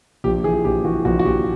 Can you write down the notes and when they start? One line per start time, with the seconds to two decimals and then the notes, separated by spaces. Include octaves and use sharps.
0.24 A#1 G4
0.44 E3 G#4
0.64 A#1 G4
0.85 E3 F#4
1.05 A#1 F#4
1.19 F#4
1.25 A#1 G4